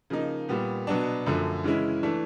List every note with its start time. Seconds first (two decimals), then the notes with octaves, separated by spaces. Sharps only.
0.10 C#3 F3 A#3 D#4
0.49 A#2 G3 B3
0.87 B2 F#3 B3 D4
1.26 F#2 D3 F3 A3
1.64 C#3 E3 G#3 C#4 E4
2.03 E3 A3 D4